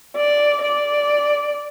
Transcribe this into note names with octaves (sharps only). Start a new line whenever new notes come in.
D5
D5